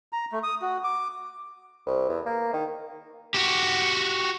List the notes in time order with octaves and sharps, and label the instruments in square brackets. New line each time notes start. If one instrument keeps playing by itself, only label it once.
[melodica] A#5
A3
D#6
F#4
D6
[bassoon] C2
E2
A#3
D#3
[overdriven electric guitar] F#4 G4